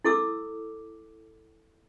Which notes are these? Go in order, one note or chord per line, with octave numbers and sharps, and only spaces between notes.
E4 A4 D6 E6